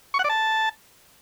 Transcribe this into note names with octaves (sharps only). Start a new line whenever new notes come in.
C#6
F#5
D5
A5